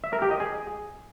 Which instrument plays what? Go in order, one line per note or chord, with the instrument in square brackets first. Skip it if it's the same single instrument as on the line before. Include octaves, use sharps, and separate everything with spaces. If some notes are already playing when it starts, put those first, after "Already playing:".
[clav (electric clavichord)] E5
A#4
G4
D#5
G#4